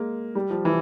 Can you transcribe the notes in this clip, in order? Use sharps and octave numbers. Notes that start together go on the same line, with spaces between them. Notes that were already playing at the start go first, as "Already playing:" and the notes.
Already playing: G#3 A#3
G3
F3
E3